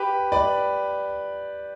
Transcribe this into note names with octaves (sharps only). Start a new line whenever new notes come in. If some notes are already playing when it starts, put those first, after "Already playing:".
Already playing: G4 B4
B4 D5